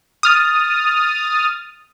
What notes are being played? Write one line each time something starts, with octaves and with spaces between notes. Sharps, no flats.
D#6 F6 A6